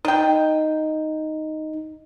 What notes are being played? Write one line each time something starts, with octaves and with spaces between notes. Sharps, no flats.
D#4 D#5 G5